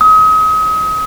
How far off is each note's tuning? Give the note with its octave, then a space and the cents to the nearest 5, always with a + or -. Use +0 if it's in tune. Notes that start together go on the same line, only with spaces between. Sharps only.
D#6 +35